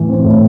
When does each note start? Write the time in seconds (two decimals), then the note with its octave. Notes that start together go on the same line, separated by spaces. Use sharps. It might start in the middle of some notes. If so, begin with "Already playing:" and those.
Already playing: A2 E3 E4
0.09 C4
0.24 A2